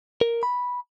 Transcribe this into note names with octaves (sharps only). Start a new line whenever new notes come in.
A#4
B5